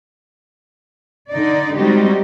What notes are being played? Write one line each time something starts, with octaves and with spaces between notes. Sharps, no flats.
D3 D#4 D5
G3 G#3 C4 D#4 F#4 G4